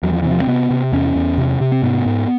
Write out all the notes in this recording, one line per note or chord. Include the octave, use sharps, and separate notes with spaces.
E2 F#3
F3
C3 E3
F3
C4
C3 B3
C3
E2 C#4
E2
C3
C3
C4
G#2 B3
G#2